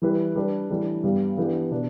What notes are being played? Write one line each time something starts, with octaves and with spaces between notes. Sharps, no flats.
E3 G3 E4 B4
G3 D4 B4
A2 E3 G3 D4
G2 G3 B3
E3 B3 D4 G4 B4
B2 B3 D4 B4